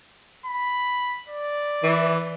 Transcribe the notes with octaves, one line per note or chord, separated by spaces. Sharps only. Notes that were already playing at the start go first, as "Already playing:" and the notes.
B5
D5
E3